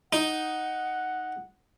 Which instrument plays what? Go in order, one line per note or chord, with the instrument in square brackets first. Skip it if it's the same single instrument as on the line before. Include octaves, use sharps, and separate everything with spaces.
[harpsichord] D#4 [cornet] F#5